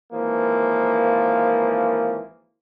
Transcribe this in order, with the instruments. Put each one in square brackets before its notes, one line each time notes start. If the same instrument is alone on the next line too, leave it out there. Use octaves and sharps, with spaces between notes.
[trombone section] G#1 E3 F3 A#3